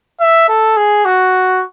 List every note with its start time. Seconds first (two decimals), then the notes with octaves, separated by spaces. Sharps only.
0.21 E5
0.49 A4
0.77 G#4
1.05 F#4